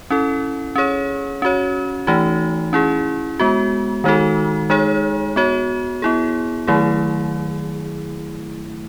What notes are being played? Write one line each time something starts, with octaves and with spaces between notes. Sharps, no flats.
C#4 E4 A4
C#4 G#4 C#5
C#4 F#4 C#5
E3 A3 D#4 F#4
C#4 E4 G#4
G#3 B3 F#4
D#3 G#3 D#4 F#4 A4
G#3 D#4 G#4 C#5
B3 F#4 C#5
B3 E4 G#4
D#3 F#3 A3 E4 G#4